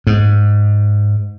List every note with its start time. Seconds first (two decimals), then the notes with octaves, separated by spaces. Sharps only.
0.07 G#2